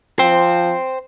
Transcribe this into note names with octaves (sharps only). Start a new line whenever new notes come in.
F3 C5 G5